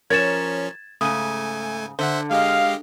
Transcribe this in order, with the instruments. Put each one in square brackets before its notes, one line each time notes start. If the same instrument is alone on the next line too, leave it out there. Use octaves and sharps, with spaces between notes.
[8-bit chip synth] F3 C#4 [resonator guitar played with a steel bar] A#4 C#5 [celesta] G#6 A6 E7
[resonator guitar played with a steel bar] G#2 C#3 [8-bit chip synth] A3 G#5 [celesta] D#6 D#7
[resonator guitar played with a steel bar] D3 [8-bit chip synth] C5 E5 F#5
[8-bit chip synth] G#3 G4 D#5 [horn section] F5